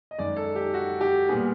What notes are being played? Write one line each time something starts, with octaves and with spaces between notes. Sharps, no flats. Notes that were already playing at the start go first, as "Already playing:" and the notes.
D#5
F#2 D#3 G#3 D5
A4
G4
F#4
G4
A#2 G3 B3 G#4